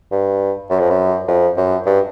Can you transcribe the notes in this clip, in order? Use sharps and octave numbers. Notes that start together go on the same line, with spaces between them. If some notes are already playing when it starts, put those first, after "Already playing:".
G2
F#2
F2
F#2
F2
F#2
G2